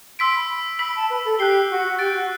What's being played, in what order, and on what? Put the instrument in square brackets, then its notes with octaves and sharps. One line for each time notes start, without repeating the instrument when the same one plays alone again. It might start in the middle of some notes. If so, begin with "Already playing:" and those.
[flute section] C6 [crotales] E6 B6 D7
[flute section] B5
[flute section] B5 [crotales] E6 B6 F#7
[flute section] A5
B4
A4
[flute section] G4 [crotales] F#6 C7 G7
[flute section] F#4
F#4
[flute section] G4 [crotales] F#6 A6 D7
[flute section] F#4